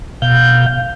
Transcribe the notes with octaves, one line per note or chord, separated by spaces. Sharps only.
B2 F5 G6